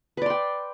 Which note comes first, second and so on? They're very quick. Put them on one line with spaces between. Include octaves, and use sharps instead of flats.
B4 D5 C6 G5